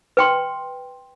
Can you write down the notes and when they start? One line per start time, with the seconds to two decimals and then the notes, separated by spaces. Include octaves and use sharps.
0.17 B4 G5 C6